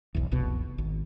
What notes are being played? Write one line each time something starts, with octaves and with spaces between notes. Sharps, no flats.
D1 B1 E2
F1 C2 B2
G#1